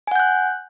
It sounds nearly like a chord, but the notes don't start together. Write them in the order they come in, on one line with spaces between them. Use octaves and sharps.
G#5 F#5 G6 F#6